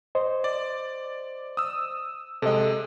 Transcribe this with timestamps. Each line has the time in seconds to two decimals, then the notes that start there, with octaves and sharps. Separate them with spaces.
0.15 C5 D#5
0.44 D5
1.57 D#6 E6
2.42 C3 G#3 A4 D#5